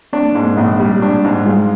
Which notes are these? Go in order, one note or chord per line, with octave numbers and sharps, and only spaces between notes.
C4 D4
A#3
G#2 G#3
A#3
A#1
G3
D4
G#2
G3
G#3 F4